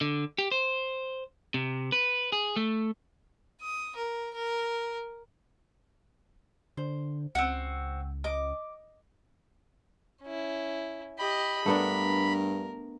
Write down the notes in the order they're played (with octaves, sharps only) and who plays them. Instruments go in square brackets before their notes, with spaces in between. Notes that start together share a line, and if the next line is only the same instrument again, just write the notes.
[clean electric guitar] D3
G4
C5
C3
B4
G#4
A3
[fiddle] D#6
A#4
A#4
[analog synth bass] D3 [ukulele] C5
[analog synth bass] C#2 [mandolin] C4 F#4 [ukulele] F#5
[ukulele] D#5 [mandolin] D6
[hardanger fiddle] C#4 E4
[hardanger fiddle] G4 D#5 [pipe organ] B5
[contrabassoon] G2 [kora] A3 B3 D4 [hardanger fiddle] A#4